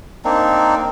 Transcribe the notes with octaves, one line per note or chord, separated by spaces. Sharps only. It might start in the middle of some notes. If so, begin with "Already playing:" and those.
A#3 C4 D4 D#4